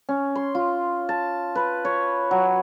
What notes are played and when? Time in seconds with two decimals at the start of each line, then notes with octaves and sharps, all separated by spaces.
0.09 C#4
0.35 C6
0.55 F4
1.09 A5
1.55 B4
1.85 C#5
2.31 F#3